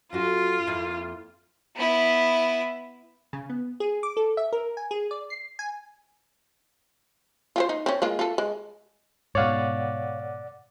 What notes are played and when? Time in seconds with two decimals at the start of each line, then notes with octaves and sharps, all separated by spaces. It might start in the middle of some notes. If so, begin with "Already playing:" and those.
0.13 F#2 F4 F#4 A4
0.67 F2 A#3 E4
1.76 B3 E4
3.33 C#3
3.50 B3
3.80 G#4
4.03 D6
4.17 A4
4.37 E5
4.53 A#4
4.77 G#5
4.91 G#4
5.11 D5
5.30 C7
5.59 G#5
7.56 F4 G4 C5
7.69 D#4
7.86 C4 C#4
8.02 G#3 A#3 F4
8.19 F4 A4
8.38 G#3
9.35 G#2 B2 C#5 D5 F5 F#5